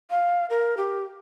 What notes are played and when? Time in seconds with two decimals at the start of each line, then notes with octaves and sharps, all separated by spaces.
0.10 F5
0.50 A#4
0.77 G4